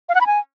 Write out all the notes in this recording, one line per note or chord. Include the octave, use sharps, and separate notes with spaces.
F5
F#5
B5
G#5